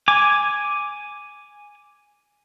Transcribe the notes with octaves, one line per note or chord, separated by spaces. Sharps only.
G#5 D6